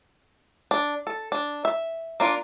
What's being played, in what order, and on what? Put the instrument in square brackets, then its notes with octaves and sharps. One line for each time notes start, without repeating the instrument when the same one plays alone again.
[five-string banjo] D4
A4
D4
E5
A#3 D4 F4